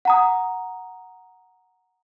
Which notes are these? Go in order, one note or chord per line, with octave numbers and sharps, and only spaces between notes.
F#5 A#5 D#6